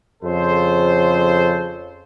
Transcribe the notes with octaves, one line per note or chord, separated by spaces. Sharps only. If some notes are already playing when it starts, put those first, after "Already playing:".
F2 C#3 A4 C5